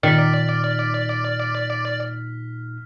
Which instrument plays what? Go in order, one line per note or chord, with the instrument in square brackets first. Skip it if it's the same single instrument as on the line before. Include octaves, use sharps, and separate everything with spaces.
[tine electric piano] A#2 D#4 [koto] D#3 [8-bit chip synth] D5 [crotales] F6 B6